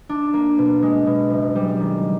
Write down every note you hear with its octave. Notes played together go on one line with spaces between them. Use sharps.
D4
A#3
B2
G#3
B2
F#1
G3
D#3